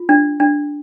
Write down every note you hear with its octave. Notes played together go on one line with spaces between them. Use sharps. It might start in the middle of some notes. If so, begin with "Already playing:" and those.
Already playing: F4
D4
D4